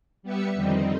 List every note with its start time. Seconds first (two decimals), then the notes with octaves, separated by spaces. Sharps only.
0.23 G3 B3 G4 B4 E5 C#7
0.55 F2 D3 D#3 G3 C4 D#4